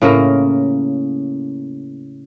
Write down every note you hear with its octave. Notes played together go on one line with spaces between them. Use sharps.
A2 C#3 A#3 A#4